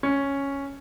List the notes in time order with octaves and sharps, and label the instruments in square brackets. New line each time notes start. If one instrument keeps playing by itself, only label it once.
[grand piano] C#4